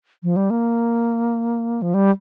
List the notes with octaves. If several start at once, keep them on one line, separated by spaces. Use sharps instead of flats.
F3
G3
A#3
F3
G3